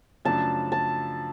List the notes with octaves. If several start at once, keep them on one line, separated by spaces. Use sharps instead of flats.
F#2 C#3 F3 A3 D4 A5
A5